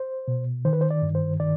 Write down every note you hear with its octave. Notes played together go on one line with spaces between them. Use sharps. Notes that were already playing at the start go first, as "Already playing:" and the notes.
Already playing: C5
B2
D#3 C5
B4
C5
D5
G2
C5
D#3 D5